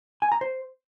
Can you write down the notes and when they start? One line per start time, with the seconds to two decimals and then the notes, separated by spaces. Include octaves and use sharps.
0.22 G#5
0.32 A#5
0.41 C5